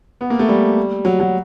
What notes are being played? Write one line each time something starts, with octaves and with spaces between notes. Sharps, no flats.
B3
A#3
A3
G3
F#3
F#3